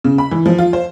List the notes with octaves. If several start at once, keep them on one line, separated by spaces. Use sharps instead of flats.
C#3
B5
E3
F3
F4
C5